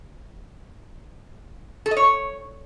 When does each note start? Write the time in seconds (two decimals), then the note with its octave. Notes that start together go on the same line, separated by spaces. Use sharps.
1.86 A4
1.91 D#5
1.97 C#5